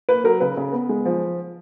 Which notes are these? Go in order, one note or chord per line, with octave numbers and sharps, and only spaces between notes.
A#3 B4
F#3 A#4
C#3 B4
C#3
B3
G#3
F3